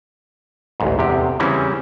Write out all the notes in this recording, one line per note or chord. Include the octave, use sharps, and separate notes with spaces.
A1 D2 G#2
E2 C3 G4
C#3 E3 G3 C4 C#4 E4